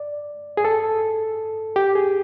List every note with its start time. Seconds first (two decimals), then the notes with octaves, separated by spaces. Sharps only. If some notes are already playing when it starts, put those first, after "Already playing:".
Already playing: D5
0.57 G#4
0.65 A4
1.76 G4
1.95 G#4